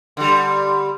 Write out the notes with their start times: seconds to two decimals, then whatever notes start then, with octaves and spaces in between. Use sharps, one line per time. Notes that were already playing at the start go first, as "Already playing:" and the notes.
0.17 D3 G3